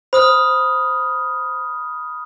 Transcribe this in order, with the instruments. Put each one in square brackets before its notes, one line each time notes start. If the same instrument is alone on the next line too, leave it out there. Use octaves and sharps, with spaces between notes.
[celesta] C5 [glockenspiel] B5 D#6 F6